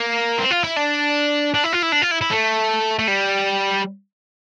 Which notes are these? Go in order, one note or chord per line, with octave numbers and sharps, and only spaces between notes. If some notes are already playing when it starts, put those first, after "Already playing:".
Already playing: A#3
C4
F4
E4
D4
D4
E4
F4
E4
D4
F4
E4
E4
A3
A3
G3